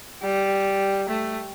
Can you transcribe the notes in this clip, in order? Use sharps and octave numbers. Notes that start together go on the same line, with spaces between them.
G3
A3